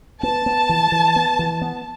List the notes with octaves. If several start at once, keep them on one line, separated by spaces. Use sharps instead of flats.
B3 A5
B3
E3
E3
B3
E3
B3